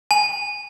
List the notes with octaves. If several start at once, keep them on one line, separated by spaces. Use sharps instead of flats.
G#5